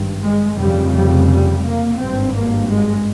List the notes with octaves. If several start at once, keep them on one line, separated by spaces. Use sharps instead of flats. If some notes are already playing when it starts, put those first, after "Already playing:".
Already playing: G#1 G2
G#3
F1 F2 C#3 G3
G3
G3
A#3
G#1 G2 C4
A#3
G#3